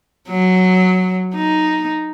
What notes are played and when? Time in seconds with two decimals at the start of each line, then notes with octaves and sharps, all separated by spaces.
0.29 F#3
1.35 D#4